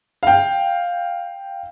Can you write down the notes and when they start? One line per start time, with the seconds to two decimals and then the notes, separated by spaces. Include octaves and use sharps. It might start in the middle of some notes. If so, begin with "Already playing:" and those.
0.23 F5 G5